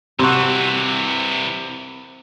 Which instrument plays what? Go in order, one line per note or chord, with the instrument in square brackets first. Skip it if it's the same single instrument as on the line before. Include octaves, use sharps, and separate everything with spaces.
[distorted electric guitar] C2 E3 [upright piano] C3 [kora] C4 F#4